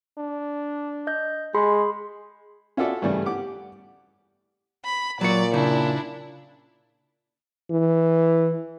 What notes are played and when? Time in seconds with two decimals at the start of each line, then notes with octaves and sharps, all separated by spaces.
0.18 D4
1.07 D#5 G6
1.54 G#3 G#4 B5 C6
2.77 C#4 F4 F#4 A4 D5 E5
3.02 G2 C#3 E3 G3 A3 C#4
3.26 G4 F#5 D6
4.85 B5
5.21 A#2 F#3 C#5 D5
5.54 C#3 D4 E4
7.71 E3